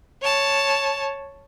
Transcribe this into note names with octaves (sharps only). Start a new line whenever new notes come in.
C#5 A5